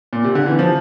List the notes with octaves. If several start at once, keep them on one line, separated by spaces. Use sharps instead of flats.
A#2
C3
D3
E3
F3